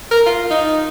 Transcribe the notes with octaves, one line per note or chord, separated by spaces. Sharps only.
A#4
F4
D#4